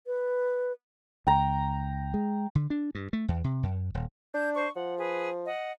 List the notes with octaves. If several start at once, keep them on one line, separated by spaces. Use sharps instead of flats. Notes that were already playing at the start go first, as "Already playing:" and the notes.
B4
C#2 G5 A#5
G#3
D3
D4
G2
A3
E2
C3
F#2
D#1
D4 G6
C5 C#6
F3 F#5
G#4 B4
D#5 F#5